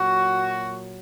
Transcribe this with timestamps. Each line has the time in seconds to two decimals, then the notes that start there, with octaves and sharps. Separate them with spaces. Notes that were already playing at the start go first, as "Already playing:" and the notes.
Already playing: A#2 F#3 F#4